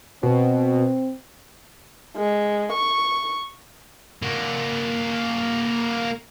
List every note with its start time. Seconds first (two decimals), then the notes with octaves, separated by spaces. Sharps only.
0.23 B2 C4
2.17 G#3
2.72 C#6
4.22 A#3 F#4